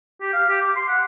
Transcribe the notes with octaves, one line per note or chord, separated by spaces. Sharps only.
G4
F5
G4
D6
C6
F#5